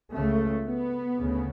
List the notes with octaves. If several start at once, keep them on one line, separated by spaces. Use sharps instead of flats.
C#2 C#3 A3
B3
D2 C#3